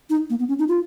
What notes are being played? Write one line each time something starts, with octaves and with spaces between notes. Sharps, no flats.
D#4
A#3
B3
C#4
D#4
F4